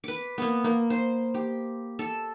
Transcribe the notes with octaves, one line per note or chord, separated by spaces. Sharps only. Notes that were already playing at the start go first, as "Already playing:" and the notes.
B4 D6
A#3 B3
A#3
C5
G4
A4